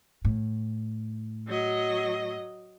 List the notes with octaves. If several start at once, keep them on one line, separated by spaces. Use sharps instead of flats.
A2
F#3 D#5